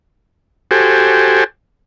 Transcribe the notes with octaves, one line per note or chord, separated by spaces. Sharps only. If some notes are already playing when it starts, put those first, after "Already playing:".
F#4 G4 A4 C5 G#5